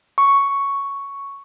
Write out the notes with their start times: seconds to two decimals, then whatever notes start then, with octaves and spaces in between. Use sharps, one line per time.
0.18 C#6